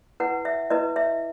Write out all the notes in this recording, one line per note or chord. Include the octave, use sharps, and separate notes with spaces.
E4 B4 F#5
E5
E4 B4 D#5
E5